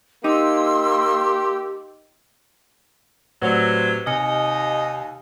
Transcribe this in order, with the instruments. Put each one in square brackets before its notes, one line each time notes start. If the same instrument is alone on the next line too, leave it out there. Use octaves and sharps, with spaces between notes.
[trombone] A#3 [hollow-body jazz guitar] D#4 [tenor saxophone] G4 [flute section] C6 E6
[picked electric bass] A2 [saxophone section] C3 F#3 [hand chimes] B4 C5 D5
[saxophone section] D#2 D#4 D#5 [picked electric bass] C3 [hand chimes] G#5 F6 C#7